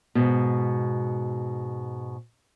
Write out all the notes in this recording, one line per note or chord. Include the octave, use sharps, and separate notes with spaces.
G#2 B2